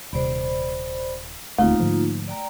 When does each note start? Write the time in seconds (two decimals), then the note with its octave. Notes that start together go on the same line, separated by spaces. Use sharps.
0.13 D#1 C3 C5 D5 B5
1.58 D#1 D2 A3 A#3 C4 D#4 F4
1.80 G#2 D3 F3
2.27 D5 G5 A#5